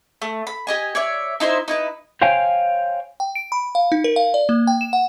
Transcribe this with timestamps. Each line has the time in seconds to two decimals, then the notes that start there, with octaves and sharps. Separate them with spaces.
0.22 A3
0.47 B5
0.67 G4 D#5 G#5
0.95 C#5 D5 E5
1.40 D#4 E4 C5 E5
1.68 D#4 E4 B4
2.22 C5 C#5 F5 G5 G#5
3.20 G5
3.35 D7
3.52 B5
3.75 F5
3.92 D#4
4.04 A#4
4.16 F5
4.34 D5
4.49 A#3
4.67 G5
4.81 E7
4.93 F#5